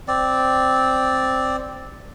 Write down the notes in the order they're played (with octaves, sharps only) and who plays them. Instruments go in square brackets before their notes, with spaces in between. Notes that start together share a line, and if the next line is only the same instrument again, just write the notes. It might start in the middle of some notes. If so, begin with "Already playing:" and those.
[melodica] C4 D5